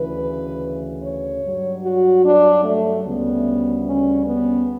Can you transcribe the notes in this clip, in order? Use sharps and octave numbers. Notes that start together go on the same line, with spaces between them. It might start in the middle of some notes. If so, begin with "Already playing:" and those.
Already playing: D2 C#3 E3 B4
C#5
G2 F#3
F#4
D4
A3
D2 C#3 G3 B3
C#4
B3